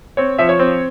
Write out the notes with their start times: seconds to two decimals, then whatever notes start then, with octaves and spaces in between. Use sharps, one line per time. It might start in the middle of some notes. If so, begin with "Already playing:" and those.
0.17 C4 C#5
0.38 F3 E5
0.49 C#5
0.59 C4